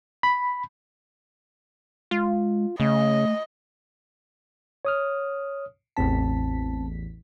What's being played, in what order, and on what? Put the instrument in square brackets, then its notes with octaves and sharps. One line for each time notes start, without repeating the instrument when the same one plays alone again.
[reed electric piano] B5
[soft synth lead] G#3 [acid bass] F4
[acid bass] C#3 [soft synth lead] A3 [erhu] D#5
[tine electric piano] C#5 D#6 F6
[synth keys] A1 E2 B6 [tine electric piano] C4 A5